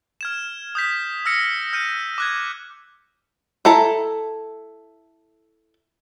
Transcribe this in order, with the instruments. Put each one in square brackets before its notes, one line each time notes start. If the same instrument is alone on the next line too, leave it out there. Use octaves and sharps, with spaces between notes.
[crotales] F6 G#6 E7
D#6 G6 B6
E6 F6 A#6 C#7
F6 G6 C#7 D#7
D6 F#6 G#6
[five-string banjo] E4 A4 A5 A#5